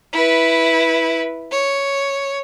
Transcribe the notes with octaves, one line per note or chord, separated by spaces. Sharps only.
E4 B4
C#5